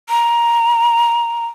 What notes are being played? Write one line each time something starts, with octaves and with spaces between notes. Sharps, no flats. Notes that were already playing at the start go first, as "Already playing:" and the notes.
A#5